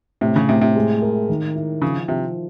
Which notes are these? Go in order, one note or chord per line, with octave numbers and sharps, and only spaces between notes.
A2 C3
C#3
A2 C3
C3
G#3
A#4
D#3
E4
C#3 F3
C3 F3